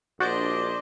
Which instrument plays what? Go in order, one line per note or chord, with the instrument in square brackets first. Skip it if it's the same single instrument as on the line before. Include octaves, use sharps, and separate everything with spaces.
[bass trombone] A#1 [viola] D4 D#5 [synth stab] F#4 [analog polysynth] C5 D5 G6